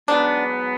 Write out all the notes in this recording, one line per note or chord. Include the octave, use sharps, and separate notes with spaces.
G#2 F#3 B3 D4